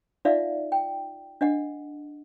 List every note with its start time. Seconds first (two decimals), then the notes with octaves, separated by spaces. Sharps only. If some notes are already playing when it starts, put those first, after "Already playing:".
0.25 D#4 F4 D5 E5 F5
0.72 G5
1.41 D4 D#5 F#5